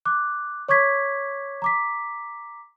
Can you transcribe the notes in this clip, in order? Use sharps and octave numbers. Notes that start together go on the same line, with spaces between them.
D6 F#6
C#5 C#6 D6 G#6 B6
A#5 D6 B6